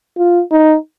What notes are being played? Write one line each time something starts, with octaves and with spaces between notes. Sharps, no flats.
F4
D#4